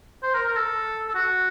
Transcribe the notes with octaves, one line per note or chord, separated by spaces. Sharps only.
C5
A#4
A#4
A4
A4
F#4